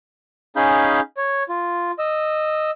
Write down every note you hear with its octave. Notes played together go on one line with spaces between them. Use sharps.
C#4 D#4 G#4 F5 B5 G6
C#5
F4
D#5 E6